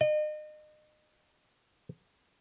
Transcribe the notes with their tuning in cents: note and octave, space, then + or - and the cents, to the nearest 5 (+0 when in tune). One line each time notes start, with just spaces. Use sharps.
D#5 -35